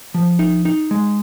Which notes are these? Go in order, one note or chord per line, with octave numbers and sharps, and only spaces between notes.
F3
D#4
D#4
G#3